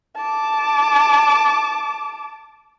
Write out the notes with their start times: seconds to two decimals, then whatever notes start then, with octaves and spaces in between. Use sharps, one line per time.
0.16 A5 D6